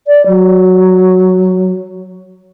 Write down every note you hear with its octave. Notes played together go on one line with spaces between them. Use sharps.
D5
F#3